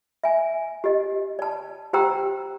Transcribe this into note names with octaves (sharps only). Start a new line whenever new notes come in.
E5 G#5
G4 D#5
D5 A5
G4 C5 F#5 G5 A#5 E6